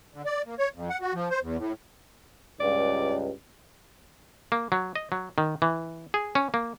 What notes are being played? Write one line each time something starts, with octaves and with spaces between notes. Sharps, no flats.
D3
D5
A#3
C#5
F2
F#5
F#4
F3
C5
E2
A2
C#2 G2 D5
A#3
F#3
D#5
F#3
D#3
E3
G#4
C#4
A#3